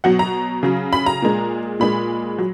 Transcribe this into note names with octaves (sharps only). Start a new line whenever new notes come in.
B2 F#3 F#5
A#5
C#3 F#3
B5
A#5
A#2 G#3
A#2 G#3 B5
F#3